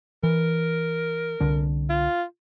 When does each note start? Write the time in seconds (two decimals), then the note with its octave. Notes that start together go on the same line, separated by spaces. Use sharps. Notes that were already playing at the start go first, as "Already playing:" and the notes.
0.23 E3 A#4
1.40 C2 D3 D4
1.90 F4